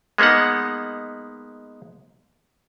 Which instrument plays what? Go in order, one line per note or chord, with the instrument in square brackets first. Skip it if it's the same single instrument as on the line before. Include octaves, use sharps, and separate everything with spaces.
[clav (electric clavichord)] G#3 A#3 B3 D#4 F#5